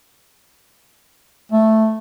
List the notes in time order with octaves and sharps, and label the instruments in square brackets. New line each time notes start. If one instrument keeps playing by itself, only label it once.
[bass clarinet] A3